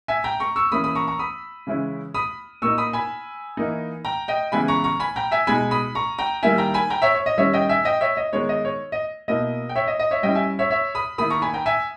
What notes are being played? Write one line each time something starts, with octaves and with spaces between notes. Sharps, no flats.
E5 G#5
G5 A#5
A#5 C#6
C#6 E6
E3 A#3 C#4 B5 D#6
B5 D#6
A#5 C#6
A#5 C#6
B5 D#6
C#3 E3 G#3 C#4 E4
B5 D#6
A#2 A#3 D#4 C#6 E6
B5 D#6
G#5 B5
E3 A#3 D#4
G5 A#5
D#5 G5
C#3 E3 G#3 B3 E4 G#5 B5
A#5 C#6
A#5 C#6
G#5 B5
G5 A#5
E5 G#5
B2 G#3 D#4 G#5 B5
B5 D#6
A#5 C#6
G5 A#5
D#3 G3 A#3 E4 E5 G#5
G5 A#5
G#5 B5
G5 A#5
C#5 E5
C#5
D#5
D#3 G3 C#4 E4 C#5 E5
D#5 G5
E5 G#5
D#5 G5
C#5 E5
D#5
D#3 G#3 B3 D#4 C#5
D#5
C#5
D#5
B2 A#3 E4 D#5
G5
C#5 E5
D#5
D#5
C#5 E5
G3 C#4 E4 D#5 G5
E5 G#5
C#5 E5
C#5 E5
B5 D#6
D#3 A#3 E4 B5 D#6
A#5 C#6
G#5 B5
G5 A#5
E5 G#5